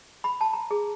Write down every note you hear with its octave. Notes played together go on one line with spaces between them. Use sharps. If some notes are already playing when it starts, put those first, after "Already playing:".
B5
A5
A#5
G#4